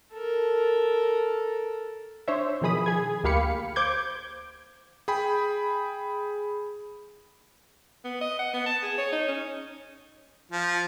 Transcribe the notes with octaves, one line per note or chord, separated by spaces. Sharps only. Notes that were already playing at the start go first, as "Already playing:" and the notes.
A4 A#4
D4 C5 C#5 E5
B2 D#3 F3 G#4 B5 D#6
G#4 G#6
D2 A#3 G4 F5 B5 C#7
C5 D6 G6 G#6
G#4 G5 B5
B3
D#5
F#5
B3
A5
G#4
C#5
D#4
C#4
F3